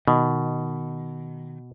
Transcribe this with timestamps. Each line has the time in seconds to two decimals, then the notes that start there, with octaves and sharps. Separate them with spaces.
0.08 B2 D#3